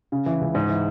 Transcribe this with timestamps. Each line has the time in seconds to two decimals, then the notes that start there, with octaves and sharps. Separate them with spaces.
0.12 C#3
0.26 E3
0.41 C#2
0.55 G#2
0.69 E3